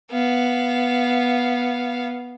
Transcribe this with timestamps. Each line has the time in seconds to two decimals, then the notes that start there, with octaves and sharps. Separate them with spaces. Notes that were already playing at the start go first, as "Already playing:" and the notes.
0.11 B3 F5